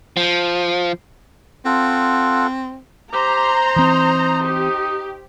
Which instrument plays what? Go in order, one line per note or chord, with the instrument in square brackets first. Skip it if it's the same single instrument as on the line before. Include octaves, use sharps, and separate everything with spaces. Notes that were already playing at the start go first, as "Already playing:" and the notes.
[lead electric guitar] F3
[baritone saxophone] C4 [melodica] F4 A4 F#5
[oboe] G4 [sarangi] C5 [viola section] A#5 C6
[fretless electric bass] E3 C4 [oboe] D#4
[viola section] G4